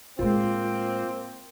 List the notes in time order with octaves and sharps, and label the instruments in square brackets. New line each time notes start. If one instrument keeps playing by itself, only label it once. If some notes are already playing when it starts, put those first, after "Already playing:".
[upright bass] A2 G#3 [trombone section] A#3 C4 [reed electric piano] F4